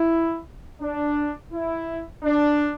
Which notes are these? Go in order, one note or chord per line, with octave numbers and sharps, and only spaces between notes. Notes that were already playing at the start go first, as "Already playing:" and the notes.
Already playing: E4
D4
E4
D4